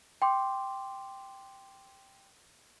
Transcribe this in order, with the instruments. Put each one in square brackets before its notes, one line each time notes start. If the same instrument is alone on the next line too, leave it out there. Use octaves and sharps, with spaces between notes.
[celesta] G5 C6 D6